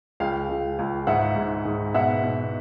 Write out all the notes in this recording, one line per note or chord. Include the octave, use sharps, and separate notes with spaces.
C#2 F5 G5
C#2
C#2
G#2 E5 F#5
G#2
G#2
B2 E5 F#5
B2